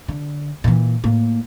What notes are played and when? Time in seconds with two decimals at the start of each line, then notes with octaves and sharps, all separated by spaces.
0.08 D3
0.64 A#2 E3
1.04 A2 A#3